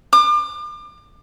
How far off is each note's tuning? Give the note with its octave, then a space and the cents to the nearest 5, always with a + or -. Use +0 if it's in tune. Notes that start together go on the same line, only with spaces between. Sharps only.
D6 +35